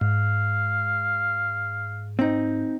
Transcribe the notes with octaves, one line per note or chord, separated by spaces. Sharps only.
G#2 F5
C4 D#4